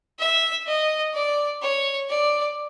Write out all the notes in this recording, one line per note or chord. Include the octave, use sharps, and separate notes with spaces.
E5
D#5
D5
C#5
D5